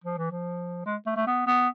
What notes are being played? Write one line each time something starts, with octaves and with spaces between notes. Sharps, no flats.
F3
E3
F3
G#3
A3
A3
B3
B3